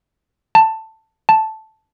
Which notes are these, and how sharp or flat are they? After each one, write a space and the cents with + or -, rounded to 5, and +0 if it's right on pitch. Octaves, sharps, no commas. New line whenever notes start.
A5 +10
A5 -5